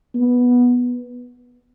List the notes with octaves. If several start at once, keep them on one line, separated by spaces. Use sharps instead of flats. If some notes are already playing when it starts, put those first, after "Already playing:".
B3